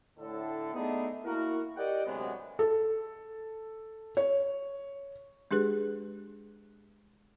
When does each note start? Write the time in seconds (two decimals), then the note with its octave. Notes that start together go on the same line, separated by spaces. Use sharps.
0.19 A2 D3 A4
0.74 A3 B3 D4 D#4 G#4
1.25 A#3 E4 F#4 A#4
1.77 G4 A#4 D5 D#5 F#5 G5
2.06 D2 C3 F#3 G#3 B3
2.59 A4
4.17 C#5
5.51 G#3 D4 G4 G#4 B4 F#6